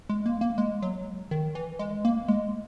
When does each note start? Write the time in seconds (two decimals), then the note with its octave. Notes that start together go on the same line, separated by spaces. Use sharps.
0.09 G#3
0.26 A#3
0.41 A#3
0.58 G#3
0.82 F#3
1.31 D#3
1.55 E3
1.79 G#3
2.05 A#3
2.28 G#3